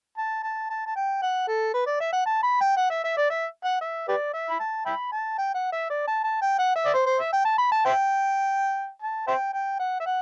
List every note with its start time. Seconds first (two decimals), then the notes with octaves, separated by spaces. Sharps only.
0.18 A5
0.43 A5
0.70 A5
0.87 A5
0.96 G5
1.22 F#5
1.48 A4
1.74 B4
1.86 D5
2.00 E5
2.13 F#5
2.26 A5
2.43 B5
2.61 G5
2.77 F#5
2.90 E5
3.04 E5
3.17 D5
3.30 E5
3.64 F#5
3.81 E5
4.08 G4 B4 D5
4.33 E5
4.50 B5
4.60 A5
4.86 E5 G5 B5
5.12 A5
5.38 G5
5.54 F#5
5.72 E5
5.90 D5
6.07 A5
6.24 A5
6.42 G5
6.59 F#5
6.76 E5
6.86 D5
6.94 C5
7.06 C5
7.20 E5
7.33 G5
7.45 A5
7.58 B5
7.72 A5
7.85 C5 E5 G5
9.02 A5
9.27 C5 E5 G5
9.54 G5
9.79 F#5
10.00 E5
10.06 F#5